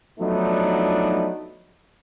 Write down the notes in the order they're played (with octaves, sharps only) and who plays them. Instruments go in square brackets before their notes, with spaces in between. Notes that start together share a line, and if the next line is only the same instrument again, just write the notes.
[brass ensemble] F3 F#3 A3 B3 D4 D#4